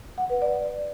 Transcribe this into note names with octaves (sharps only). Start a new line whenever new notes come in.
F#5
B4
D5